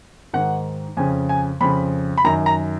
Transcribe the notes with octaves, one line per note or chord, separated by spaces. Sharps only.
G#2 D#3 F#5
F2 C#3 G#5
G#5
F2 C#3 B5
B5
F#2 D#3 A#5
A#5